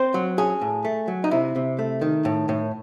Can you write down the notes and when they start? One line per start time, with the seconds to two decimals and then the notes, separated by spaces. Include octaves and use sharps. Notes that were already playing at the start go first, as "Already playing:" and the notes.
Already playing: C4 C5
0.14 F#3
0.38 C#4 G#4
0.61 A2
0.85 A3
1.08 F#3
1.24 D#4
1.31 C3 E4
1.56 C3
1.79 A3
2.01 D#3
2.25 A2
2.49 A2